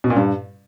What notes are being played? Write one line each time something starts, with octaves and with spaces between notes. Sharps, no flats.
B2
A#2
G2